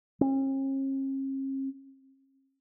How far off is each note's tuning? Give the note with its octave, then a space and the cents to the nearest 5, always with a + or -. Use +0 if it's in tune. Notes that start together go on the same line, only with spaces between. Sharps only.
C#4 -45